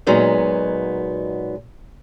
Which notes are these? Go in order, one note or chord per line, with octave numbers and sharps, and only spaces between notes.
A#2 F#3 G#3 B3 D#4